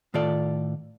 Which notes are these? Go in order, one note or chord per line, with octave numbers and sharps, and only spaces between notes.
A2 D#3 F4 A4 D5